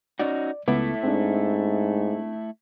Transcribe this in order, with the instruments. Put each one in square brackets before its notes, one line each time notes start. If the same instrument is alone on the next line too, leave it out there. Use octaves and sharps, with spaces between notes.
[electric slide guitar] C#4 D#4 F#4 [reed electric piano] D5
[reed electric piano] C#2 B3 D6 [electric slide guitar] A3 E4
[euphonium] G#2 [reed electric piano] C4 D4